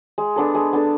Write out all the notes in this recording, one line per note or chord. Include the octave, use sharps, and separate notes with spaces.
G#3
B3 D4 A4
G#3
B3 D4 A4